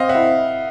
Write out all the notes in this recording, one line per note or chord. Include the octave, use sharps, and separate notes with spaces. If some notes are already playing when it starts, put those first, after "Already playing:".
Already playing: C4 D#5 F5
E5 F#5
E4